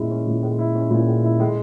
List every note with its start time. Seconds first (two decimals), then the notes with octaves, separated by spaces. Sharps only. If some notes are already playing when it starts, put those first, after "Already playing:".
Already playing: A#2 G#3 C#4 E4
0.11 C#4
0.27 A#2
0.43 G#3
0.59 E4
0.75 C#4
0.91 A#2
1.07 G#3
1.24 E4
1.40 G#3